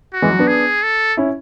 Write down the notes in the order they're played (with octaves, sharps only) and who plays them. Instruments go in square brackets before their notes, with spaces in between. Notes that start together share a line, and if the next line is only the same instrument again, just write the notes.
[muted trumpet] F#4
[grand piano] E3 G#3
F#3
B3 D4
[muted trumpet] G#4
A4
[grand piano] C#4 E4